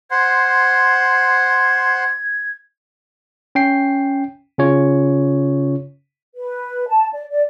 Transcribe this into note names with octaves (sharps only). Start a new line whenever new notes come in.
C5 F#5 C6 G#6
C#4 G5 C7
C#3 C#4 F4 C#5
B4
A5
D5
D5